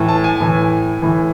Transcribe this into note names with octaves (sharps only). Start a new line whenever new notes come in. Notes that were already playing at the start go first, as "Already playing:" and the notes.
Already playing: A2 E3
A5
G#5
A2 E3
A2 E3